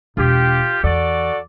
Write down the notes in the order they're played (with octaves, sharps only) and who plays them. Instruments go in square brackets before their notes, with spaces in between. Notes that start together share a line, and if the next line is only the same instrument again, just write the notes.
[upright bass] E1 [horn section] F4 G4
[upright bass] E2 [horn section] F#4 A4 D5